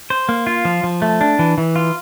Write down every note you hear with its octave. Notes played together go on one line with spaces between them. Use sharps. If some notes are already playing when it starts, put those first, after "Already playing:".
C5
A#3
F4
F3
F3
A3
D4
E3
E3
F4